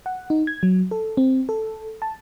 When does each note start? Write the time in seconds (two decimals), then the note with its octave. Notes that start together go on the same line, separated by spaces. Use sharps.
0.06 F#5
0.30 D#4
0.47 G#6
0.63 F#3
0.91 A4
1.17 C4
1.49 A4
2.02 A5